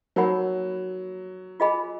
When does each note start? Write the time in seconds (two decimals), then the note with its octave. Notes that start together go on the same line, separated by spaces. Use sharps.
0.16 F#3 D#4 A#4 C#5 F#5 B5
1.60 F4 G#4 D#5 G#5 B5